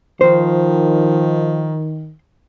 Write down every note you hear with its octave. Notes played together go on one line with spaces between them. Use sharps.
D#3 F3 C5